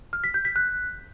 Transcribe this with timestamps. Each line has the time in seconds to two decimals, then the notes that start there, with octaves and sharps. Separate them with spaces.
0.13 F6
0.24 B6
0.34 G6
0.45 B6
0.56 F#6